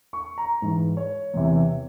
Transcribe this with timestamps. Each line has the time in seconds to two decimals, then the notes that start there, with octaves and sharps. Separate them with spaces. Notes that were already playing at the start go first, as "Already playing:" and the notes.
0.13 C#6
0.38 A#5
0.62 G#2 E3
0.97 C#5
1.34 E2 C3 E3